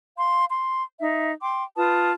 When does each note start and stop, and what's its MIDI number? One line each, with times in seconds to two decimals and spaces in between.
0.18 0.46 77
0.18 0.46 84
0.49 0.83 84
0.99 1.31 63
0.99 1.31 76
1.42 1.64 79
1.42 1.64 84
1.42 1.64 86
1.77 2.11 65
1.77 2.11 71
1.77 2.11 81
1.77 2.11 87